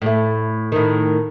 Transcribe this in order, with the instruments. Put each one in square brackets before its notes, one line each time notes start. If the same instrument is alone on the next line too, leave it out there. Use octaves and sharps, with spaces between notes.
[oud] A2 A3
A2 D#3